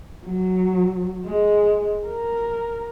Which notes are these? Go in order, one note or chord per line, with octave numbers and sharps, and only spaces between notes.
F#3
G#3
A#4